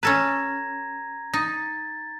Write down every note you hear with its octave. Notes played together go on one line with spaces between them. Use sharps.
C#4 A4 B4 A#5 G#6 A#6
D#4 A6